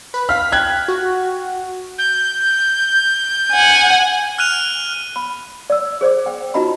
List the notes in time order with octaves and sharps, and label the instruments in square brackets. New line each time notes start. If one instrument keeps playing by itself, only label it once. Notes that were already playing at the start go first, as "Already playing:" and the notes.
[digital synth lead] B4
[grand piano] F5 F6 [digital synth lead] B6
[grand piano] G5 F#6 G#6
[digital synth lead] F#4
[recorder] G6
[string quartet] F#5 G#5
[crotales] F6 F#6 D#7 F7
[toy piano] B5
D5 E6
G#4 C5 D5 D6
G5
D#4 F4 F#4 D#5 A#5 B5